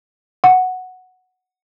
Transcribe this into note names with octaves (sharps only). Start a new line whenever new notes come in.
F#5